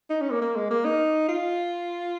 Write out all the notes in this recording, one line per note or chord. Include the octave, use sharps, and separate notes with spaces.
D#4
C#4
A#3
A#3
G#3
A#3
D#4
F4